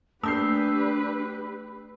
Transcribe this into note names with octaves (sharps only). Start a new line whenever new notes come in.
A3 D4 G4 B4 E6 G6 C7